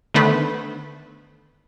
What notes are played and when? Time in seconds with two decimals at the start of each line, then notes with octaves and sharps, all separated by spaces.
0.14 D3 D#3 A3 B3 B4 C5